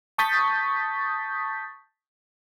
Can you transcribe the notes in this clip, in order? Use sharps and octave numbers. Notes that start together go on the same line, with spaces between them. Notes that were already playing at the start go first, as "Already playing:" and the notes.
A5 C#6 D#6 G6 A6 B6